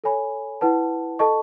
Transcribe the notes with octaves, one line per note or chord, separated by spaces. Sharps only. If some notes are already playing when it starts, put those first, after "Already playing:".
A4 C#5 G#5 B5
E4 B4 F#5 A5
A4 D#5 A5 C#6